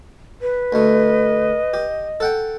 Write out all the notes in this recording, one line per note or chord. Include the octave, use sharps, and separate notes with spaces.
B4
D2 A3 D#5
G4
A4 F#5 G5